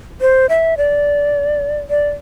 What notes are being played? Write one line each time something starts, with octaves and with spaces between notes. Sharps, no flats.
C5
E5
D5
D5